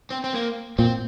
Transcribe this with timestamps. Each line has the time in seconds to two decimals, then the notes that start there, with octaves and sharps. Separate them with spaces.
0.10 C4
0.24 C4
0.34 A#3
0.78 A#2 C4